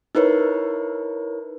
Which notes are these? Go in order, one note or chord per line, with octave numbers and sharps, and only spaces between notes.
D#4 E4 A#4 B4 C#5